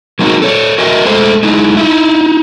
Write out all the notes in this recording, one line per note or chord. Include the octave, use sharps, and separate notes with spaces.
F#3 A#3 C4 D#4 F4 F#4
A4 C#5 D5
F#4 A#4 D#5 E5 G#5
G#3 A3 A4 C5 E5
G#3 D#4 E4
D#4 E4 E5